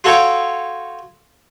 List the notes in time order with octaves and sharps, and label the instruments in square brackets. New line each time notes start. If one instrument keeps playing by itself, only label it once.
[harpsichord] F4 F#4 A4 C#5 F5 G5